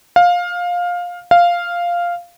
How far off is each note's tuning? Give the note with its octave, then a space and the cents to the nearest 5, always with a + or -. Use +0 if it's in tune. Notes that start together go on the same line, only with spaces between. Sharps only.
F5 +15
F5 -5